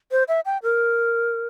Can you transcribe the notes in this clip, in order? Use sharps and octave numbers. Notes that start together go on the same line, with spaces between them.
C5
E5
G5
A#4